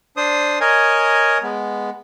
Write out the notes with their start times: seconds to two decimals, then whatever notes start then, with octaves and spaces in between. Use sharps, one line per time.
0.17 D4 C5 D#6
0.61 A#4 C#5 D#5 G#5
1.43 G#3 B3